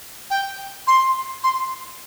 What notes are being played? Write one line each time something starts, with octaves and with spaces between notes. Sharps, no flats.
G5
C6
C6